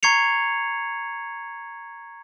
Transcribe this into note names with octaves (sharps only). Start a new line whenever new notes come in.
A#5 C#6 G#6 C7 C#7 F7